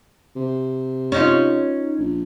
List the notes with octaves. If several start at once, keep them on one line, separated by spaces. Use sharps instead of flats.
C3
C#4 D#4 F4
A#1